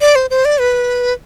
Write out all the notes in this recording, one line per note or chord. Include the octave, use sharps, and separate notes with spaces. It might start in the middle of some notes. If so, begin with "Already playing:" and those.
D5
C5
C5
D5
B4